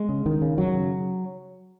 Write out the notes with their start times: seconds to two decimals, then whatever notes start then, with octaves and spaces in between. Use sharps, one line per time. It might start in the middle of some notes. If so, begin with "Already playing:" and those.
Already playing: G#3
0.09 C#3
0.25 C#2 D#3
0.42 C#3
0.58 F#2 F#3
0.74 C#3